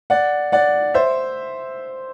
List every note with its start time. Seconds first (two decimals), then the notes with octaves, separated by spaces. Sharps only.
0.10 D5 F#5
0.52 D5 F#5
0.94 C5 E5